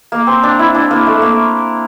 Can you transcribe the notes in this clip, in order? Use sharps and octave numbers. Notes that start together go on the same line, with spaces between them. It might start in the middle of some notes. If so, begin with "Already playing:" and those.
A#3
C4
D4
E4
D4
A#3
A3
A#3